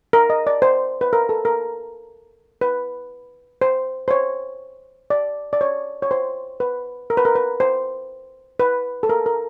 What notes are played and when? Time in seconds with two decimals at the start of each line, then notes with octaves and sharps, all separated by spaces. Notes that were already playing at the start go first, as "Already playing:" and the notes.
0.13 A#4
0.30 D#5
0.47 D5
0.62 C5
1.01 B4
1.13 A#4
1.29 A4
1.45 A#4
2.61 B4
3.62 C5
4.08 C5
4.11 C#5
5.10 D5
5.53 D5
5.61 C#5
6.02 C#5
6.11 C5
6.60 B4
7.10 A#4
7.17 B4
7.25 A#4
7.35 B4
7.60 C5
8.60 B4
9.03 A4
9.09 A#4
9.26 A#4